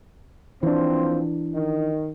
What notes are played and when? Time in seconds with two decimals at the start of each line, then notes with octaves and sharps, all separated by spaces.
0.63 D#2 E3 F3 C4 D4
1.54 D#3